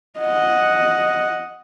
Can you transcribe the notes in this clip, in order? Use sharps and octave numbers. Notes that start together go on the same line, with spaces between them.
D#5 F#5